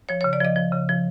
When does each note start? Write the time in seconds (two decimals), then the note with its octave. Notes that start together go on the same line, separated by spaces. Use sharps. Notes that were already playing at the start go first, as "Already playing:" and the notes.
0.09 F3 C#5
0.21 C#5
0.24 C#3
0.33 D5
0.40 F3 D#5
0.56 F3
0.72 C#3
0.89 F3